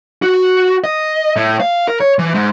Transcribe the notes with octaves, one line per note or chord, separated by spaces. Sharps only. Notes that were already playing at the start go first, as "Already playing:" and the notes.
F#4
D#5
A2
F5
A#4
C#5
E3
G#2